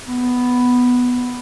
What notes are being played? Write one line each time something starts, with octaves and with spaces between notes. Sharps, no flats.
B3